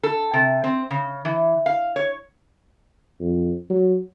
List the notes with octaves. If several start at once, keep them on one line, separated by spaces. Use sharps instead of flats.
A4
C3
C4
C#3
E3
F5
C#5
F2
F#3